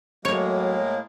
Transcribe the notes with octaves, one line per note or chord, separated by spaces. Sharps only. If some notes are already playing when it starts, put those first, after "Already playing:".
A2 F#3 G#3 A#3 C#5